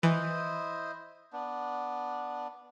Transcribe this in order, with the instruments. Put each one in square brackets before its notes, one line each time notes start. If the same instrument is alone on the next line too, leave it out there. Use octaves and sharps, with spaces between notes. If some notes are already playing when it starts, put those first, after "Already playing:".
[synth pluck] E3 [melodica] E4 C5 D#5
[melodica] B3 D4